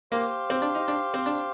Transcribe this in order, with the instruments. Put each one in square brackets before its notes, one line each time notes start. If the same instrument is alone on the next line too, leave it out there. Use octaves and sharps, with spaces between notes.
[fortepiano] A#3 [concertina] G4 C5 F5
[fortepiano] C4
D4
D#4
D4
C4
D4